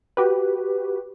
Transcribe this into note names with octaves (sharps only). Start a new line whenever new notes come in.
F#4 G4 B4